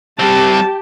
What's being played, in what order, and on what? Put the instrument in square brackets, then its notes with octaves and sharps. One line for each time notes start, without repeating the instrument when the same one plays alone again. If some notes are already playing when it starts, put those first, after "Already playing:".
[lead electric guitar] G3 C4 [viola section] G4 [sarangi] A5